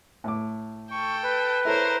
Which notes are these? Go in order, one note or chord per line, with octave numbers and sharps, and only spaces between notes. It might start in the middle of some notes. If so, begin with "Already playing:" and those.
A2 D6
A4 G5 C#6
B4
E4 A4 A#4 C5 C#5